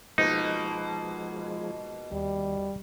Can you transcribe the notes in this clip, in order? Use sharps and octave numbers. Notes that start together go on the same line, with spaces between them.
B2 F3 G#3 A#3 D#4
D#2 G3